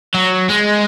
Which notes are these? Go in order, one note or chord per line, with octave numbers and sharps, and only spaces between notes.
F#3
G#3